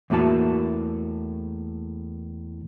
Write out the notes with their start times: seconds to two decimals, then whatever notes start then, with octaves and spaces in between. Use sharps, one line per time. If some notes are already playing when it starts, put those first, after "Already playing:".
0.10 E2 A2 A#3 F#4 A5